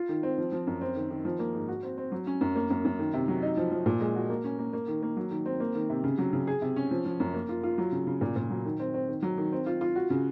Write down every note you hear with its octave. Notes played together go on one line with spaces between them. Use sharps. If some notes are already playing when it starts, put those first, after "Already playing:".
Already playing: F4
D#3
C4
F3
F3
F#2
C4
D#3
D#3
F3
A#3
G#2
F#4
C4
C4
F#3
C#4
F#2
A#3
F#2
F#2
D#3
C3
F#3
D#4
F3
F3
A#2
G#3
F#4
A#3
C#4
A#3
A#3
D#3
A#3
F#3
D#3
C4
A#3
D#3
C3
C#3
F#3
C#3
G#4
C3
C#4
F3
F3
F#2
A#3
F4
F4
F#3
C#3
C#3
A#2
A#2
F#3
D#3
C4
C4
D#3
F#3
D#3
C4
F4
F4
F#4
C#3